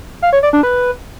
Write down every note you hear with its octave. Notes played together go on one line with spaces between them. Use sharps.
F5
C#5
D5
D4
B4